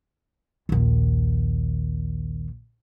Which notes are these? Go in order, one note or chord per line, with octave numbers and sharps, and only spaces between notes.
A#1 D#2